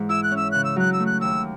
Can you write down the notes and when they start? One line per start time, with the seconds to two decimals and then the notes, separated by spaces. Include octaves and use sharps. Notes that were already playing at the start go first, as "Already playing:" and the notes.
Already playing: G#2 E3
0.09 E4 E6
0.23 F#6
0.31 C#4
0.37 E6
0.51 C#3 F#6
0.64 E6
0.76 F#3 F#6
0.93 E6
1.00 A3
1.06 F#6
1.21 D#2 E6